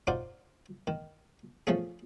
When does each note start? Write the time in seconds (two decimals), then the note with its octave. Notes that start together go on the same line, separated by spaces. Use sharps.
0.07 D#4 F4 F#4 C5 D5
0.87 D#3
1.67 F3 A3 C#4 G#4